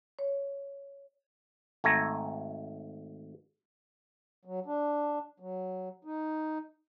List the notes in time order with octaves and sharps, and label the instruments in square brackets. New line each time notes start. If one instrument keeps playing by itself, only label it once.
[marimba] C#5
[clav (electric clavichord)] G#1 A3 G#5 A#5
[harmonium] F#3
D4
F#3
D#4